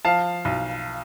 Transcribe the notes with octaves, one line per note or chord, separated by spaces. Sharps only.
F3 F5 A5
B1